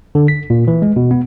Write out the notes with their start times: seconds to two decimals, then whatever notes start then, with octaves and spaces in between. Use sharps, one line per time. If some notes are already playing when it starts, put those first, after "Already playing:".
0.15 D3
0.28 B6
0.50 A#2
0.68 E3
0.82 G#3
0.96 B2
1.11 B3